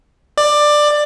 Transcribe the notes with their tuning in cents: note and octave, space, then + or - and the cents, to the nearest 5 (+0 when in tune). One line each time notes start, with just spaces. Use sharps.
D5 +15